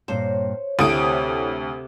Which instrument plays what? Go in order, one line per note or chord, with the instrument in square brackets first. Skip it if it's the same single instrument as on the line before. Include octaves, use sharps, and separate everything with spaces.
[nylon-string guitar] G2 A#2 C4 [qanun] C5 [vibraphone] C#5
[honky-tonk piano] D2 D#6 D7 [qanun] C3 [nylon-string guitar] A3 E4 E5